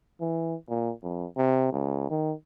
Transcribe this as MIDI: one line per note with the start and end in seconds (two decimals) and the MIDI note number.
0.20 0.55 52
0.69 0.92 46
1.03 1.26 41
1.37 1.70 48
1.72 2.09 37
2.10 2.33 51